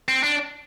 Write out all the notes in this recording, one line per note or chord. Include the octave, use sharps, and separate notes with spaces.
C4
D4